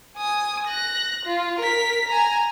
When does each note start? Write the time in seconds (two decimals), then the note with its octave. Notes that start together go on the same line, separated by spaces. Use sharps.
0.17 G#5 D#6
0.67 F#6 A#6
1.25 F4
1.60 A#4 B6
2.08 G#5 A#5